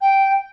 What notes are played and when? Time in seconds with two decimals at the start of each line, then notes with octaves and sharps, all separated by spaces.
0.01 G5